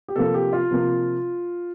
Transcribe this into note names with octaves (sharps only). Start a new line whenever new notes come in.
G4
C3 F3 A#3 A4
G4
F4
C3 F3 A#3